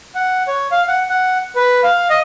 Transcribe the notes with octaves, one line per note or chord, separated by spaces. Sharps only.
F#5
C#5
F5
F#5
F#5
B4
F5
D#5